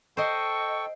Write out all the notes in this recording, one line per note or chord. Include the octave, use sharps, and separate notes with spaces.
A4 C5 D#5 G5 C#6